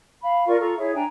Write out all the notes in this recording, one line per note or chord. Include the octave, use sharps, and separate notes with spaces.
F5 B5
F4 A#4 D5 C#6
F4 A4 A#5 C#6
E4 G#4 C#5 E5
D4 G5 G#5 A#5